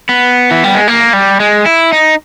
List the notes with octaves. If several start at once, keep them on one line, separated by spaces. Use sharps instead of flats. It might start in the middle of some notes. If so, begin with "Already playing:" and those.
B3
E3
G3
G#3
A#3
G3
G#3
E4
D#4